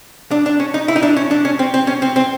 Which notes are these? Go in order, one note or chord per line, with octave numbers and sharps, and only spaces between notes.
D4
D4
C#4
D#4
E4
D#4
D4
C#4
D4
C#4
C4
C4
C#4
C4
C4